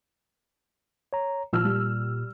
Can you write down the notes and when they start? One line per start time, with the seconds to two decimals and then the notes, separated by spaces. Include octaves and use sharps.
1.13 C#5 A#5
1.53 A#2 F3 E6 F6
1.64 G3